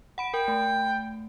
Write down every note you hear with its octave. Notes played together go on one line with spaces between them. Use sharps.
F#5 B5 D7
A#4 G5
A3